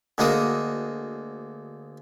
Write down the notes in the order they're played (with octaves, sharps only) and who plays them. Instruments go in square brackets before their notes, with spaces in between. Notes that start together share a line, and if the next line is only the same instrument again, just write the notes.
[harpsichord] D2 G#3 A#3 F#4 D#6